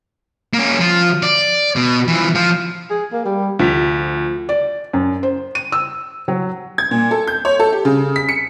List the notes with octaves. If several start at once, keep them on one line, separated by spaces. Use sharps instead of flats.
A#3 C#4
F3
D5
B2
E3 F3
F3
G#4
A#3
G3
D2 F3 B6 F7
D5
F#2
C5
D#7
E6
F#3
G#6
A#2
A4
G6
C#5
A4
G4
C#3
B6
C#7